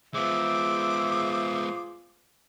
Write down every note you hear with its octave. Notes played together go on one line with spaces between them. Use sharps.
G#3 B3 F4 G#4 C5 E5 D6